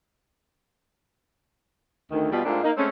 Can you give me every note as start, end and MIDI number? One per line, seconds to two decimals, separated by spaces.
2.11 2.31 38
2.11 2.31 51
2.31 2.41 47
2.31 2.41 55
2.31 2.41 65
2.44 2.59 44
2.44 2.59 57
2.44 2.59 58
2.44 2.59 60
2.44 2.59 62
2.44 2.59 65
2.63 2.71 58
2.63 2.71 63
2.76 2.89 56
2.76 2.89 57
2.76 2.89 60
2.76 2.89 61